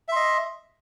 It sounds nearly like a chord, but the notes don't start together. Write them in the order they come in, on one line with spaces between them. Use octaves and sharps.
E5 C6 D#5